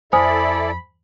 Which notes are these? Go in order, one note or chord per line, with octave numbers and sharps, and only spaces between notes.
F2 E4 A4 C5 D5 G#5 B5 D#6